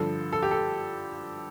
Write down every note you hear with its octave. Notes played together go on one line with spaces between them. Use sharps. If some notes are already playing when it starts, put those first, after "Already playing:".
Already playing: G2 D3 F3 A4
A4
G4
A4